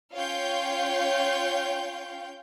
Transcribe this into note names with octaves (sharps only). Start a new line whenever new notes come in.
C#4 F4 C#5 F5 G5 G6